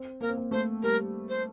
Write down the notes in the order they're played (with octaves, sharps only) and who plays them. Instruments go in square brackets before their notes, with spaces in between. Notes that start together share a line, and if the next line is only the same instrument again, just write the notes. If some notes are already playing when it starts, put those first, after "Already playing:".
Already playing: [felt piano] C4
[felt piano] A#3 [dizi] A#4
[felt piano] C4
A#3
[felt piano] A3 [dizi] C5
[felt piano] G3 [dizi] A#4
[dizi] C5